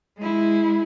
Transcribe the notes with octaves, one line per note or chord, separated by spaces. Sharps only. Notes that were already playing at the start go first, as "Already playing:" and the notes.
G#3 E4